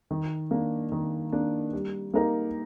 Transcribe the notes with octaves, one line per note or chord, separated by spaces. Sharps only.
D#3
A#3 D4
D#3
A#3 D4
G3
A#3 D#4 G4 A#4